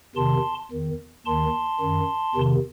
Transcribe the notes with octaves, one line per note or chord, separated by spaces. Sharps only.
E2 C3 D#3 A5 C6
E2 D#3
D#2 D#3 A5 C6
F#2 D#3
E2 C3 D#3